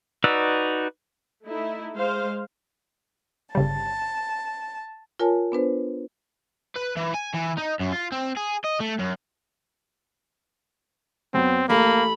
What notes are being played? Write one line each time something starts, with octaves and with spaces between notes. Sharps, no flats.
D#4 F#4 B4 D5 E6
A3 D#4 E4
G#3 C5 F5
G1 C#3 G3 A5
F4 A#4 C#5 G#5 A5
B3 D4 B4 C5
B4
E3
G#5
E3
D#4
F#2
F4
C4
G#4
D#5
A3
F#2
F#2 B3 C4
A1 A3 A#3 A4 B5